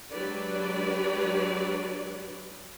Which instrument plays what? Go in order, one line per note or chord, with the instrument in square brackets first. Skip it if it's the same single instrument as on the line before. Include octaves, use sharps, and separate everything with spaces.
[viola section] F#3 G#3 D4 G4 B4 D5